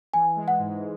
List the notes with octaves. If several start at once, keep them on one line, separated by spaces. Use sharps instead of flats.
E3 G#5
G#3
F#5
G#2